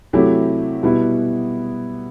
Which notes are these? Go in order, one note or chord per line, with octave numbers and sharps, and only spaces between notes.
C3 F#3 A3 E4 G4
B2 G3 B3 E4